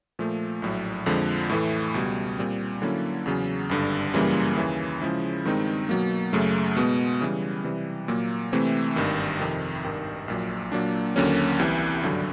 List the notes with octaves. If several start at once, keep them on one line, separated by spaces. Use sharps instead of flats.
A#2 F3 A3
A#1 A2 F#3
F2 D3 F3 G#3
A2 E3 A3
C#2 B2 G3
A#2 G3 C4
D3 F#3 A#3 C#4 E4
E2 C#3 F#3
G#1 G2 D3
F#2 C#3 E3 G3 A#3
D#2 C#3 E3
C#3 F3 G#3 C#4 E4
G2 D#3 G#3 C4 D#4
B2 F#3 A#3
F#2 C#3 F#3 A3
B2 G#3 B3
C#3 E3 G3
C3 E3 G3
A#2 F#3 A#3
C3 E3 A3 C4
G#1 G2 D#3
F2 C3 D#3
G#1 G2 D#3
A#1 A#2 F#3
A#2 F#3 A#3 D4
D#2 D3 F#3 A#3 C#4
C2 C3 E3
G#1 G2 D3 F#3